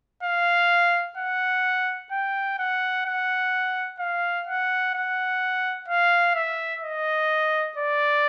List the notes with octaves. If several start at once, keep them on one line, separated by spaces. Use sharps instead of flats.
F5
F#5
G5
F#5
F#5
F5
F#5
F#5
F5
E5
D#5
D5